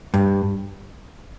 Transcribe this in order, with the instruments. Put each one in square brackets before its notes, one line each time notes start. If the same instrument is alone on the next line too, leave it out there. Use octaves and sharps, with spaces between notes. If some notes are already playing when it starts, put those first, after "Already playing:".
[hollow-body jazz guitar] G2